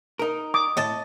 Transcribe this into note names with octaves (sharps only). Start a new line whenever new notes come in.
D#4 A#4
D6 D#6
A2 D#5 A5